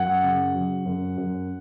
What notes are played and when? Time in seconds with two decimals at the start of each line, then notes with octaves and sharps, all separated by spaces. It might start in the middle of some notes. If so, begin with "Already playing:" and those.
Already playing: F#2 F#3 F#5
0.22 C#3
0.54 F#3
0.85 F#2
1.17 F#2